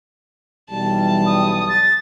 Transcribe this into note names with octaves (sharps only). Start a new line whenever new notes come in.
B1 E3 G3 A5
D#6
A6